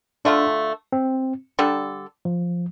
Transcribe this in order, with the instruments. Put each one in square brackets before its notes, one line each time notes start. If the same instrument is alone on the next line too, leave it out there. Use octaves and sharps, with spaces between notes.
[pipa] D3 A3 F4 [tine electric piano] D4
[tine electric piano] C4
[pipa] D3 G3 D4 A4
[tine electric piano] F3